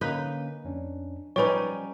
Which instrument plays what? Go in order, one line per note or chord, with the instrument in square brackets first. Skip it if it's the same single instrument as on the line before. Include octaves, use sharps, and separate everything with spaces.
[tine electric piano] D3 A#3 C#4 [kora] D#4 B4
[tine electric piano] F2 C#4 D4
[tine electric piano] F3 [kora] G3 C#4 D#4 [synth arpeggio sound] B4 C#5